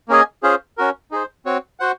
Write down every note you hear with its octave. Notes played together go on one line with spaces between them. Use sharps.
A#3 C#4 G#4 D#5 G#5
C#4 F4 G#4 C5
C#4 F#4 A#4
D#4 G#4 C5
C4 F#4 C#5
F#4 C5 F#5